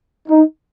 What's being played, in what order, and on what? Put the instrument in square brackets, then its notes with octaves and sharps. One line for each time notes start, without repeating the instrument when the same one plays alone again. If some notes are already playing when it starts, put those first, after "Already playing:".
[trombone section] D#4